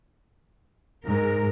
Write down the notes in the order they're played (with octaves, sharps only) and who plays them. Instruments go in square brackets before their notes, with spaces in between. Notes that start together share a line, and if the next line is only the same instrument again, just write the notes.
[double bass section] G#2 [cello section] A#4